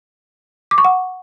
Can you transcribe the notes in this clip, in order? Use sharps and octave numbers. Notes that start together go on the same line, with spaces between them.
D6
C#6
F#5